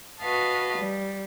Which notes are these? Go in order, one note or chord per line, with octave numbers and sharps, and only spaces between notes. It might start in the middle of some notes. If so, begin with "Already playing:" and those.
F#4 B4 D#5 F5 A5
G3